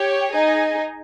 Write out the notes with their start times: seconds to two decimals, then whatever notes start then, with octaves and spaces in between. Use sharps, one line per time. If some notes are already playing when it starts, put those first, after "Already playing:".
Already playing: G4 C#5 G5
0.32 D#4 G#4 D#5 G#5